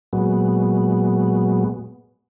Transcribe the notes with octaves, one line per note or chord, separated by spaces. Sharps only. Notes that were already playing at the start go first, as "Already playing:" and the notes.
A#2 F#3 G#3 B3